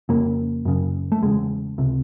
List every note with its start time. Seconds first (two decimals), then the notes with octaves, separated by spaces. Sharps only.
0.09 F2 C#3 A#3
0.65 F#2 C#3
1.12 A3
1.22 E2 C#3 G#3
1.78 C#2 C3